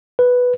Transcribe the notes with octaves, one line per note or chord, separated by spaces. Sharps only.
B4